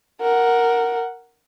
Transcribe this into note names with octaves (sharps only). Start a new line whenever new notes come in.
A#4 F#5